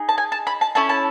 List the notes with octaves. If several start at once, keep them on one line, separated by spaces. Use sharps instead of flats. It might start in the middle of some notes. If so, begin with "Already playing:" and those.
Already playing: D#4 G#4
A5
G#5
A5
B5
A5
C#4 E4 A4 A5
A5